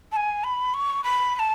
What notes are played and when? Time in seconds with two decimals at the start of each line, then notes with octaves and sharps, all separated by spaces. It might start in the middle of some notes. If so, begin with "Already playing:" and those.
0.12 A5
0.16 G#5
0.44 B5
0.74 C#6
1.04 B5
1.35 B5
1.39 A5